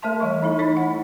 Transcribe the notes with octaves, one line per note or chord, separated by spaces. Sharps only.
A3 A#4 E5 A5 C6
E3 G3 A3 C#6
G3 D#4 E4 A4
E3 D#4 E4 C#5 B5
F#5